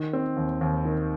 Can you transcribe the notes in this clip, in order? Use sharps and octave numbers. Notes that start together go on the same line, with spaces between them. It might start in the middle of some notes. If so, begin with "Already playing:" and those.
Already playing: D#3
C4
D#2
D#2
D#3